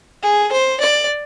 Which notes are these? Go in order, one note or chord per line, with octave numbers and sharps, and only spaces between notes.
G#4
C5
D5